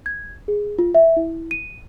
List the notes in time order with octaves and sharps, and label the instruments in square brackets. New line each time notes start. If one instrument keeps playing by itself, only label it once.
[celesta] G#6
G#4
F4
E5
E4
D#7